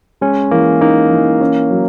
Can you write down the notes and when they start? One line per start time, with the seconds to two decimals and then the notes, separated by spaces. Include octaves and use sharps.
0.21 G#3 C#4
0.51 E3 A#3
0.81 A#3 D#4
1.11 E3
1.40 C#4
1.70 F#3